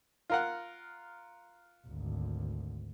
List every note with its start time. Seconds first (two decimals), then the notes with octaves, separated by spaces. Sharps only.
0.30 F4 A#4 F#5
1.87 G#1 D2